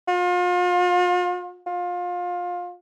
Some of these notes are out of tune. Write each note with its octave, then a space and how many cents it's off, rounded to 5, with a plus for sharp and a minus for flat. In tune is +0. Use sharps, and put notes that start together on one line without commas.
F4 +40
F4 +25